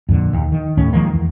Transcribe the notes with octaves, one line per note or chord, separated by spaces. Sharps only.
F2 A#2 D3
D#2
D#3
D#2 A2 C#4
D#3 F3 G#3 A#3
E2